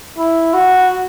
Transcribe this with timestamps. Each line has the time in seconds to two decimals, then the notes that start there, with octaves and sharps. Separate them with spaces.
0.18 E4
0.54 F#4